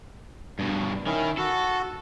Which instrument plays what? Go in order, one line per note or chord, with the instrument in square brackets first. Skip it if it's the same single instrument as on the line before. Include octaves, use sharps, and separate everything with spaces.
[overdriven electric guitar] G2 B2
[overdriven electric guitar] D#3 [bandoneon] C#4 E4
[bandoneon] F#4 [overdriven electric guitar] A4